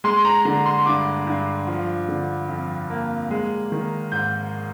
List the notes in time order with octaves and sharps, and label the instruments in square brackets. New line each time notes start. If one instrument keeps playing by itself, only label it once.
[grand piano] G#3 C6
A#5
D3 A#5
C6
G2 D6
G2
F3
D3
F2
A#3
G#3
D#3
G#2 G6